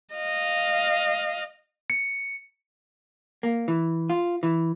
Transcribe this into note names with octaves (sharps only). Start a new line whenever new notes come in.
D#5 F5
C#7
A#3
E3
F4
E3